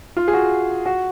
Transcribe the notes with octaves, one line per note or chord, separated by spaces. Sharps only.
F4
G#4
F#4
F#4